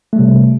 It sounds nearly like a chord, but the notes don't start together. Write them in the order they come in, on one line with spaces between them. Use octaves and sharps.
A3 G3 C3